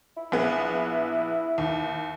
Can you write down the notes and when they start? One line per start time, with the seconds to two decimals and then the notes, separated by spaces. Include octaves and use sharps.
0.17 E4
0.32 A#1 B3 G#4
1.58 D#2